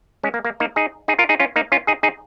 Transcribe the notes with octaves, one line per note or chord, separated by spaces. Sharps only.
G#3 C#4
A#3
A#3
A#3 D#4
D#4 G#4
D#4 G#4
F4 A#4
D#4 G#4
C#4 F4
A#3 D#4
C#4 F4
D#4 G#4
D#4 G#4